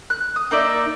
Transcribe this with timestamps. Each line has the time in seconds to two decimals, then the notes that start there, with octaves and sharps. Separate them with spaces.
0.10 F#6
0.36 D#6
0.51 A#3 D#4 D5 E5